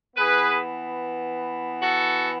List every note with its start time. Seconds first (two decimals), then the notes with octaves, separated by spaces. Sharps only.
0.16 E3 B3 G#4 B4
1.82 F#4 A4